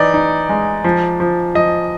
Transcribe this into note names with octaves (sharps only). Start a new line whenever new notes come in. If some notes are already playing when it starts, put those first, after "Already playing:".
Already playing: E3 D#4 D5
D#4
G#3
F3
F3
F3 D#5